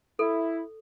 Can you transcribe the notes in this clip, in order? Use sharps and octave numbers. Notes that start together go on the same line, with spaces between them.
E4 A4